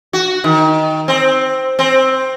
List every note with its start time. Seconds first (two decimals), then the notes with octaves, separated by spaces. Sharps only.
0.13 F#4
0.44 D#3
1.08 C4
1.79 C4